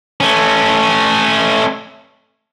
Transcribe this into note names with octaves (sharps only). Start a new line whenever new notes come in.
A3 C#4